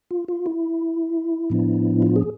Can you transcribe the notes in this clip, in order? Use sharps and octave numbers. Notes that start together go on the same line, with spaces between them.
F4
F4
E4
A2 F3 B3 D4
F4
G#4